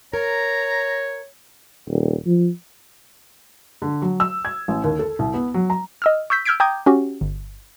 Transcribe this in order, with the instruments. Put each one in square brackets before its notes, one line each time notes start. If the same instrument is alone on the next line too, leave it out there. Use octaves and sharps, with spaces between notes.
[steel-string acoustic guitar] A#4 [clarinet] C#5 [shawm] A#5
[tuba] D#1
F3
[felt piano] D3
F#3
E6
G#6
A1
D#2
A4
C2
B3
F#3
A#5
[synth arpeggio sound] D#5 E6 F6
C#6 E6 G6 B6
E6 F6 G6 G#6 B6 D7
G5 A#5 D6 D#6 G6 G#6
C#4 F#4 G4
G1